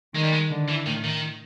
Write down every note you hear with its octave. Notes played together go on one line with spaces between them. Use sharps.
D#3 G#3
G3
G#3
D3
E3
A2 D#3
D#3